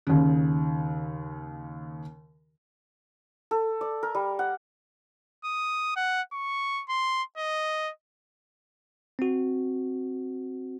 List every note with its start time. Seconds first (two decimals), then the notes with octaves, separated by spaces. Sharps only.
0.07 D#2 C#3
3.51 A4
3.81 D5
4.03 A#4
4.15 G3
4.39 F#5
5.45 D#6
5.96 F#5
6.33 C#6
6.89 C6
7.38 D#5
9.19 C4 F#4